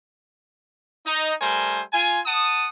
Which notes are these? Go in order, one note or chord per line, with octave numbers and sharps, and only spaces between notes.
D#4
G3 A3 A#4 C5 G#5
F4 G#5
F#5 A5 D#6